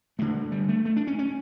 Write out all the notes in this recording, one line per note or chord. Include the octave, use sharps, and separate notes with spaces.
G2 D3 A3
G3
A3
A3
D4
C#4
C#4